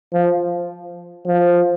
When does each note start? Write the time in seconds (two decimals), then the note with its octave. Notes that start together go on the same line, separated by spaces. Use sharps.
0.14 F3
1.27 F3